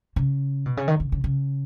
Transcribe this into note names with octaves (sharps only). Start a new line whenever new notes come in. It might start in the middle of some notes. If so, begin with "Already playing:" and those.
C#3
B2
C#3
D#3
C#3
C#3
C#3